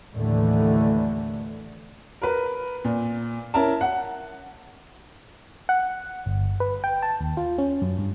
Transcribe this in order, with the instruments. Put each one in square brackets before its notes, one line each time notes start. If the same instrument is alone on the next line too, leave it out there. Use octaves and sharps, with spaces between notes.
[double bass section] D#2 A2 D3 E3 A3
[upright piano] A#4 B4
A#2
C#4 E4 A#4 A5
F#5
[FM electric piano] F#5
G1
B4
G5
A5
D#2
F4
C#4
F#2
G2